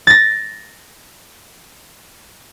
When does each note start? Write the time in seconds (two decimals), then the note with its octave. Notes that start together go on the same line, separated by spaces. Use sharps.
0.07 A6 A#6